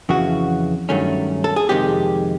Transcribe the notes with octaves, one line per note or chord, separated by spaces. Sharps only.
F2 C#3 E3 F#4
G2 D#3 F#3 A3 C#4
A4
G#4
F2 C3 D#3 G#3 G4